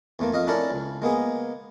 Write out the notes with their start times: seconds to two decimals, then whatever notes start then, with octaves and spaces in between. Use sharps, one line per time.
0.19 E2 A3 A#3
0.33 F2 D#5 F5
0.47 C#4 D4 E4 A4 A#4 D5
0.71 C#2
1.02 G#3 A#3 B3 G#4